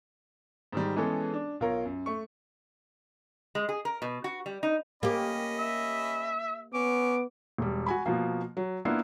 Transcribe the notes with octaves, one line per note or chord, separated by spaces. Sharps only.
G#2 D#3 G3
E3 G#3 B3 C#4 G#4 A4
D4
B1 F4 A#4 C#5
F#2
A3 C#6
G#3
G#4
A#4
B2
F#4
G3
D#4
A#3 C#4 G4 D#5 B5
E5
B3 C#4 D6
E1 G3
F#4 G#5 B5
B2 F3 A#3
F#3
A#3 B3 D4 E4 F4